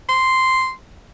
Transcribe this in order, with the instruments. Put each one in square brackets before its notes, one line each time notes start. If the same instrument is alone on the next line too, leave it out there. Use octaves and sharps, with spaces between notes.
[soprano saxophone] C6